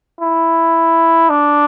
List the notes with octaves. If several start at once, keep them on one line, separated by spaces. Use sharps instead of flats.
E4
D4